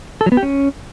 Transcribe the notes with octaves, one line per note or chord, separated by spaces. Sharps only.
A4
F#3
B3
G4
C#4